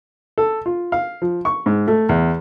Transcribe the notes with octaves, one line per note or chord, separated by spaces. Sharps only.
A4
F4
F5
F3
C#6
G#2
A3
E2